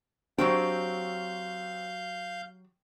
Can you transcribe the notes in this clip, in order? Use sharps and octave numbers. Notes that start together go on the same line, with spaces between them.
F#3 C4 D4 F#4 G4 F5 G6